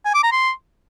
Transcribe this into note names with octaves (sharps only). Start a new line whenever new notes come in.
G#5
D6
A#5
C6